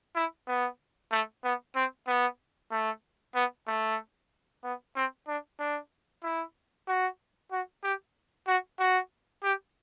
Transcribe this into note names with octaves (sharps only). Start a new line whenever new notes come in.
E4
B3
A3
B3
C4
B3
A3
B3
A3
B3
C4
D4
D4
E4
F#4
F#4
G4
F#4
F#4
G4